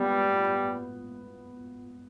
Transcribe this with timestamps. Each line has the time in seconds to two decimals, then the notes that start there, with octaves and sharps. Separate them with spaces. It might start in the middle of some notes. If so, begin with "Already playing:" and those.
Already playing: G3 B3